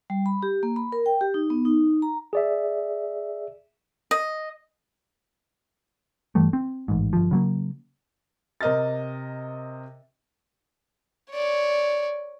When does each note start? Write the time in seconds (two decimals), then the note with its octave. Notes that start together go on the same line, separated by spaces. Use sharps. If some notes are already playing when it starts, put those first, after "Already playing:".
0.10 G3
0.26 B5
0.43 G4
0.63 A#3
0.76 B5
0.92 A#4
1.06 G5
1.21 G4
1.34 D#4
1.50 B3
1.65 D#4
2.02 A#5
2.33 G#4 D5 E5
4.11 D#5
6.35 G2 E3 G3 A3
6.53 C4
6.88 A1 G#2
7.13 G1 F3
7.31 C#3 F#3 A#3
8.61 C3 A#4 D#5 F6 A6
11.32 C#5 D5